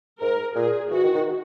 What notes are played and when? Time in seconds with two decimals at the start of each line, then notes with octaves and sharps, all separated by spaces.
0.20 G#2 A#4
0.55 A#2 G#4
0.91 E3 F#4
1.03 D#3
1.15 D#3